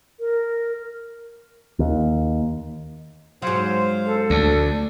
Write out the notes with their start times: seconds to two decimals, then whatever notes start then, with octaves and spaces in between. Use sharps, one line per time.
0.19 A#4
1.79 D#2
3.42 G#2 F#3 C5 F5 C6
4.05 A4
4.30 D2 D4